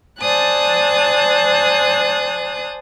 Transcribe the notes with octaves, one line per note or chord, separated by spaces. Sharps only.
C5 D5 G#5 A5 D#6 F#6